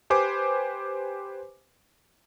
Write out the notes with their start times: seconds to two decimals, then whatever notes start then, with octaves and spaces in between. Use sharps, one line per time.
0.10 G4 B4 C5 G#5 D6